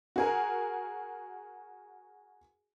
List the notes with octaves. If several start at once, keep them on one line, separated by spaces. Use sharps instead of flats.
F#4 G#4 A#4